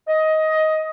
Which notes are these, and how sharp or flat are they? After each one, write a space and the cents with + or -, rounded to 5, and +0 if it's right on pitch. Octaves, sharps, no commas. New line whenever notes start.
D#5 +15